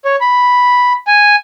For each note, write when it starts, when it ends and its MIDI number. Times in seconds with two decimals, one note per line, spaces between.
0.05 0.16 73
0.21 0.93 83
1.07 1.36 80